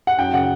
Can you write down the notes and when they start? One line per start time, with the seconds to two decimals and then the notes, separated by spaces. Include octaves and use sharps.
0.07 F#5
0.19 F#2 G5
0.33 C#3 F#5